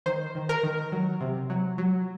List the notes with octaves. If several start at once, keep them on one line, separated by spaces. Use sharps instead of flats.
D#3 C5
D#3
A#4
D#3
F#3
C3
F#3
F#3